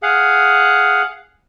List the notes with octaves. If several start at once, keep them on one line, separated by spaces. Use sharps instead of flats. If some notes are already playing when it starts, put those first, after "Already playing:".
G#4 F5 F#5